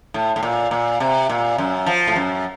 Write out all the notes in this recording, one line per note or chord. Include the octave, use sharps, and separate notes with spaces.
A2
A2
A#2
A#2
C3
A#2
F#2
F3
A2
F#2